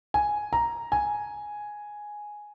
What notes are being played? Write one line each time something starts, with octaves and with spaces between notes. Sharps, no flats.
G#5
A#5
G#5